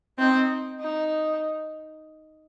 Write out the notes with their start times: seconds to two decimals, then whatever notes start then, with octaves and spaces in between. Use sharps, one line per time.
0.19 C4 D#4
0.80 D#4